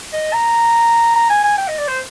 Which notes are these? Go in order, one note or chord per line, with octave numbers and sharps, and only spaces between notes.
D#5
A#5
A#5
G#5
G#5
G5
D#5
D5
C5